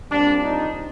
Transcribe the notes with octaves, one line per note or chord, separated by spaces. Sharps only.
C2 A#2 G3 C4 D4
D#4